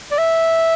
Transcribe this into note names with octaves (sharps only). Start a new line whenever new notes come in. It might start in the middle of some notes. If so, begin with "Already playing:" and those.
D5
E5